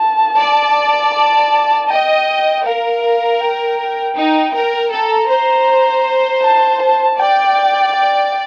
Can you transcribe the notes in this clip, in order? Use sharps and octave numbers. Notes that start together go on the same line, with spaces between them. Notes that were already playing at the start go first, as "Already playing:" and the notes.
Already playing: A5
D5
A5
D#5 G5
A#4 F5
F5
G5
D#4
A#4
A4 A#5
C5
A5
A5
D5 G5
G5